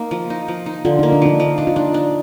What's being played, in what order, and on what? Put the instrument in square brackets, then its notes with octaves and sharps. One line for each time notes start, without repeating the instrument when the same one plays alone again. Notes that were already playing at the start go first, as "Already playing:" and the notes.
Already playing: [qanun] A#3 D#4
F3
D#4
F3
D#4
[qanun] D3 [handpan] F4
[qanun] A#3 [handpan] D#4
[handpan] D4
[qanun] F3 [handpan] D#4
[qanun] F3
[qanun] D4 [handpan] D#4
[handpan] F4
[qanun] D4 [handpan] D#4
[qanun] D4